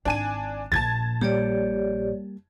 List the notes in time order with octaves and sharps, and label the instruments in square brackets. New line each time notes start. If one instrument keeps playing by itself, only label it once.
[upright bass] G#1 C4 [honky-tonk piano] D4 G#5 D#7
[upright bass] A#1 A#2 [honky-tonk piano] A5 G#6 A6
[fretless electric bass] G3 A#3 [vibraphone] G4 C#5 D5